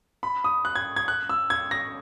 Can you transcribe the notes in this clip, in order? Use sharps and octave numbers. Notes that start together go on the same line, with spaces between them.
B5
D#6
F#6
G#6
G#6
F#6
E6
G#6
A#6